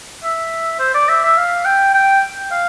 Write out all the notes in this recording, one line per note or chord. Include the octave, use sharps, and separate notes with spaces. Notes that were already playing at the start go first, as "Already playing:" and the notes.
E5
C5
D5
E5
E5
F5
G5
G5
F5